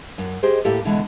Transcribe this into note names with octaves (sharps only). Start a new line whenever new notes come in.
F#2
G4 G#4 C5 D#5
A2 A#3 E4 G4 A4 D5
B2 D3 E3 G#3